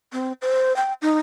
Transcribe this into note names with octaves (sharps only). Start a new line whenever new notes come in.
C4
C5
G5
D#4